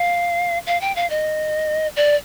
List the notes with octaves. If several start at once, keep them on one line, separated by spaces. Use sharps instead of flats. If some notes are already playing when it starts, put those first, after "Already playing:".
Already playing: F5
F5
G5
F5
D#5
D5